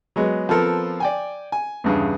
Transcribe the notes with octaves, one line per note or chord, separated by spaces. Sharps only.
F#3 G#3 B3
F3 B3 C4 A4 A#4
D5 G5 G#5
G#5
E2 G2 C#3